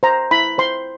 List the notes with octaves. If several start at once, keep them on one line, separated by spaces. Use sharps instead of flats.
C5 A#5
E4 B5
C5 C6